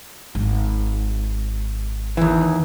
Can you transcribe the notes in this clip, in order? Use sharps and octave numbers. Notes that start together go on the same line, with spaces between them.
G#1
D#2 E3